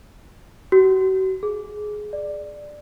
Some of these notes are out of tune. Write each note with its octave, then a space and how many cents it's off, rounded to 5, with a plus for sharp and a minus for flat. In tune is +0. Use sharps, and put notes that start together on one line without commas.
F#4 +40
G#4 +15
D5 +10